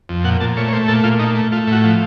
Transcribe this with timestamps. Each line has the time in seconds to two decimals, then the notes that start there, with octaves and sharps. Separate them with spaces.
0.09 F2
0.24 A#2 F#5
0.40 A#2 A5
0.57 A3 C#5
0.68 C#5
0.73 A3 C5
0.88 A#2 A4
1.04 A#2 F4
1.19 A3 D#4
1.35 A3
1.52 A3 F4
1.67 A2 F#4
1.84 F3